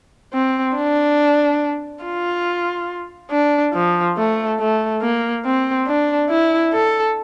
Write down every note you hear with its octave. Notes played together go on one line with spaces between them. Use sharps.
C4
D4
F4
D4
F3
A3
A3
A#3
C4
D4
E4
A4